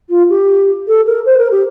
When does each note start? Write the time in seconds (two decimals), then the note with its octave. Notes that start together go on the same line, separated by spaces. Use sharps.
0.09 F4
0.29 G4
0.87 A4
1.06 A#4
1.25 C5
1.38 A#4
1.51 G4